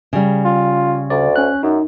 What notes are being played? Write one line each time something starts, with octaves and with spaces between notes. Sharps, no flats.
C#3 G3
F4
D2 D5
C#4 F#6
F#2 D#4